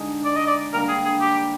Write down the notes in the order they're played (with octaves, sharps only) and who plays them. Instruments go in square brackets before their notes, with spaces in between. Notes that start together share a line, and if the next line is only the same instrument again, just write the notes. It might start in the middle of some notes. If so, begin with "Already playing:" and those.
Already playing: [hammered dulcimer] D3 G#3 D#4 G#4
[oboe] D5
D#5
D5
[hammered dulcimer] D3 G3 A#3 [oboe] A#4
[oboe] G#4
G#4
G4